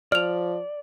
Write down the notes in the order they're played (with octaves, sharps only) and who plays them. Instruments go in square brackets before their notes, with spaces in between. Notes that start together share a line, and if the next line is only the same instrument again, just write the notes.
[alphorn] F3 [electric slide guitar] D5 [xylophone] F6 F7